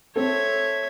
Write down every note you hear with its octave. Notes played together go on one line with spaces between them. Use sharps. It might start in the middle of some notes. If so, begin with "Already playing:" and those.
C4 A4 C#5 E5